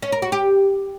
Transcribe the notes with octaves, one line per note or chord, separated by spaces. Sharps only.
C#4
A#4
F#4
G4